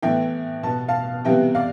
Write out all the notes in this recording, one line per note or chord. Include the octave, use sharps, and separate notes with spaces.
A2 E3 B3 E5 G5
B2 B3 A5
F5 A5
C3 E3 G3 B3 E5 G5
D5 F5